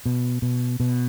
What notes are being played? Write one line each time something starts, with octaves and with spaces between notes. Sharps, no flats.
B2
B2
B2